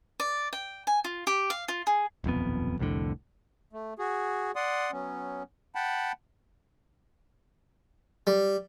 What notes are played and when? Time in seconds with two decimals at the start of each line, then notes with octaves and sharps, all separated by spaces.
0.20 D5
0.53 G5
0.87 G#5
1.04 F4
1.27 G4
1.50 F5
1.68 F4
1.87 G#4
2.24 D#1 B1 F2 B3
2.79 C2 F2 A2 D3
3.73 A3
3.99 F#4 G#4
4.56 D5 F#5 C6 D#6
4.92 F#3 B3 C#4
5.75 F#5 G5 A5 B5
8.27 G3